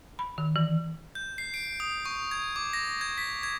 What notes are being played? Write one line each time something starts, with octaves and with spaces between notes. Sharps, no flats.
B5
D#3
E3
G6
C7
D7
D#6
C#6
G#6
D6
A#6
G#6
B6
G#6